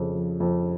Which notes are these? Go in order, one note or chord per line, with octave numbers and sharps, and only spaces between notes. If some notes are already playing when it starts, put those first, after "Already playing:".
Already playing: F2 C#3
F3
F2